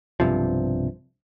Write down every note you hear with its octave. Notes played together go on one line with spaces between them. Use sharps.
B1 G2 C3 F3